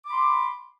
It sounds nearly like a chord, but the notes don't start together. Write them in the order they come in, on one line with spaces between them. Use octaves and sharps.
D6 B5 C6